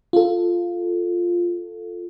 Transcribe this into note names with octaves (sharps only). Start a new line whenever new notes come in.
F4 A4